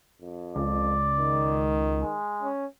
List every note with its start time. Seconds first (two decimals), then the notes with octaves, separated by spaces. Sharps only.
0.22 F2
0.56 C#2 D5
1.18 D#3
2.01 G#3
2.43 C#4